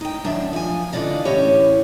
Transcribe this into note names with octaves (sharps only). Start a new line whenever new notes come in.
D#4 G5
F#2 D#3 D4 E5
F3 G#5
D3 E3 F4 D5 D#5
A2 E3 C#4 G4 C#5